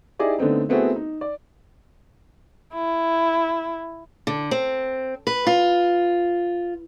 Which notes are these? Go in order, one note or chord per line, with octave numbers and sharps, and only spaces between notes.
D#4 E4 G4 G#4 D5 D#5
D3 A3 B3 C4 D#4
A3 B3 C4 E4 F#4 G#4
D#4
D5
E4
D3
C4
B4
F4